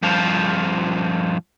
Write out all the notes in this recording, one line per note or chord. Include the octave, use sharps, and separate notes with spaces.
G2 F3